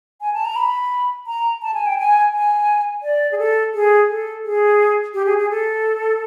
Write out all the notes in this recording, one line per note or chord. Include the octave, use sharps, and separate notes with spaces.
G#5
A5
A#5
B5
A#5
A5
G#5
G5
G#5
G#5
D5
G#4
A4
G#4
A4
G#4
G4
G#4
G#4
A4